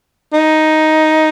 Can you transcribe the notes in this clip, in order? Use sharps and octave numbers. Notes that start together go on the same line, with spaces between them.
D#4